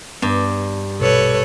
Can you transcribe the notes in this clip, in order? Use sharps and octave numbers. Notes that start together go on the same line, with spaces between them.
G2 B3
A#1 B2 A4 B4 C#5